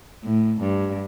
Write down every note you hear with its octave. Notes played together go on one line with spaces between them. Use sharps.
A2
G2